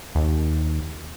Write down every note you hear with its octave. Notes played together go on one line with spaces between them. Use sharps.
D#2